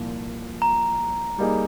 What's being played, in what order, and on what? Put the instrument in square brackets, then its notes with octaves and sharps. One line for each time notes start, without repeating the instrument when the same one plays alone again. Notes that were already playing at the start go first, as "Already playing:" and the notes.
Already playing: [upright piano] C2 A#2 F3 A#3
[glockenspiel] A#5
[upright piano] G3 A#3 D#4 G#4